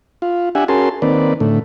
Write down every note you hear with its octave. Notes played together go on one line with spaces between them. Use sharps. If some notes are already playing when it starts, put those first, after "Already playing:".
F4
D4 G4 E5 F#5 G#5
C#4 F#4 G#4 A#4 A5 C6
D#3 A#3 C4 B4 D5
A2 D3 A3